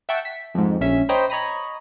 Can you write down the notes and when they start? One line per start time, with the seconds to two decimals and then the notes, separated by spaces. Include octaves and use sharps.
0.09 E5 F#5 G5 A5 C#6 E6
0.25 B6
0.55 F2 G#2
0.81 A#1 C#4 E5 B6
1.09 C5 C#5 D#5 G5 A#5 B5
1.30 C#5 D#5 A#5 B5 D#6